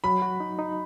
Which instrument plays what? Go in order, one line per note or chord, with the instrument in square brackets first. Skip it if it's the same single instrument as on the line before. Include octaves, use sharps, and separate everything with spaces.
[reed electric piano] F#3 [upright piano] B5
[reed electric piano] F#4
D#4
D#4